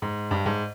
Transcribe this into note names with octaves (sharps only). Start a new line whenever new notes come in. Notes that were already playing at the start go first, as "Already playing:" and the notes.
G#2
G2
G#2